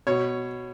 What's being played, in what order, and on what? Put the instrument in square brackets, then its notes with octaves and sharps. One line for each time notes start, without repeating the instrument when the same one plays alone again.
[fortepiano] B2 C#5